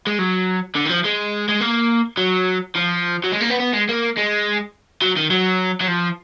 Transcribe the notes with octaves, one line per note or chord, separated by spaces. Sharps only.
G#3
F#3
D3
D#3
F3
G#3
G#3
A#3
F#3
F3
F#3
G#3
A#3
B3
B3
G#3
A#3
G#3
F#3
D#3
F#3
F#3
F3